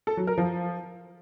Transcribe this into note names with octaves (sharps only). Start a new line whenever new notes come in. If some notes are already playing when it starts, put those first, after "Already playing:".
A4
F#3
A#4
F3